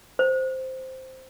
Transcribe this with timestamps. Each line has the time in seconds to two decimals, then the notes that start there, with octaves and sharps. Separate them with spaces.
0.19 C5